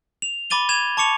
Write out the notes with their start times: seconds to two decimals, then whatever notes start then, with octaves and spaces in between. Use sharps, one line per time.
0.22 F7
0.50 B5 D6 A6 D#7 G7
0.69 G#6 E7 F7
0.97 A5 C#6 D6 C#7 F7